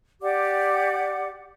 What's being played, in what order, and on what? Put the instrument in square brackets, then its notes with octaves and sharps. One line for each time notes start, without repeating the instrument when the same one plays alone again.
[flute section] G4 D5 F#5 D6